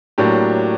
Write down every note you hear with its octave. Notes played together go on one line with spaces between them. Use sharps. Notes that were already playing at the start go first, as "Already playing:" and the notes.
A2 F#3 A#3 D4 G4